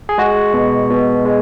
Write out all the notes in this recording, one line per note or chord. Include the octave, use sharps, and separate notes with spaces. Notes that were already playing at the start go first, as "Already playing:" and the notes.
G#4
G#3 F#4
B2
B2
G#3